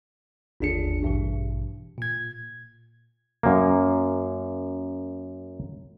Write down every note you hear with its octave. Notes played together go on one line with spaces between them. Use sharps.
G1 D#2 D4 G#4 C#7
A1 G2 B2 E3
A#2 G#6
F#2 A#3